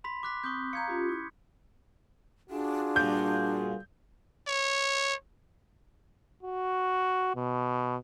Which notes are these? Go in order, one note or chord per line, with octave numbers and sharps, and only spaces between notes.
B5 C6 B6
D6 F#6 B6
C4 C#6 D#6 G6
F5 A#5 G6 G#6 C#7
C#4 F4 G4
E4 D#6
D4 F4 F#4 G#4
G2 A#2 G6
C#5
F#4
B2